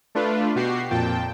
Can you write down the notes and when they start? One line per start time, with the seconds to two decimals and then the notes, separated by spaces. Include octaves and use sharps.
0.15 A3 D4 F4 B4
0.55 B2 F#4 G4 C7
0.91 F2 A#2 G5 A5